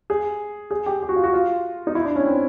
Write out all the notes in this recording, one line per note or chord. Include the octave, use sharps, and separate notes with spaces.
G#4
G#4
G4
G4
F#4
F4
F#4
F4
D#4
E4
D4
C#4
C4